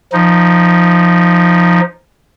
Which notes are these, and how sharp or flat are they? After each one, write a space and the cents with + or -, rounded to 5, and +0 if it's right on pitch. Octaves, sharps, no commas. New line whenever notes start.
F3 +0 D#4 +0